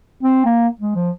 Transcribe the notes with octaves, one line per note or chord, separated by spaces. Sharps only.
C4
A#3
G#3
F3